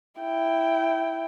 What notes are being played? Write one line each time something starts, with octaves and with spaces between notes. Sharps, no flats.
E4 G5